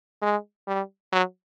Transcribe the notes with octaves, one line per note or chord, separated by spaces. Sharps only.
G#3
G3
F#3